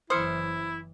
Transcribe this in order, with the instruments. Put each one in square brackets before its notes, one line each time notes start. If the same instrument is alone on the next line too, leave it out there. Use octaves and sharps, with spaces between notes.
[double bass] F#1 E3 [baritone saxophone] E4 [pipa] C5 [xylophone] D#6 F6 C#7